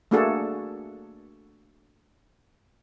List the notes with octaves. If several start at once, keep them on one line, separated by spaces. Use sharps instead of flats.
A3 A#3 D4 F#4 G#4 A4